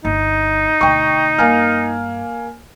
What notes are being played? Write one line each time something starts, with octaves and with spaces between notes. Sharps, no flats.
G1 D#4
D2 B2 G5 C#6
G2 A#3 G#5 F6